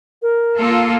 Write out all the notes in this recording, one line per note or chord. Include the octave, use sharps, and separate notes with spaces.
A#4
A#3 F4 A4